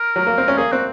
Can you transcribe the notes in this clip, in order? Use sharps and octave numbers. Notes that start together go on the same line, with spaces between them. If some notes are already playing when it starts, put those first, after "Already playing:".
Already playing: A#4
F#3
A#3
C4
C#4
A#3 G#4
C4 F#4